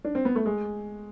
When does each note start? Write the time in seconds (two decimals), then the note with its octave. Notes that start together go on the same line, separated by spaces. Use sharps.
0.04 D4
0.15 C4
0.25 B3
0.36 A3
0.46 G#3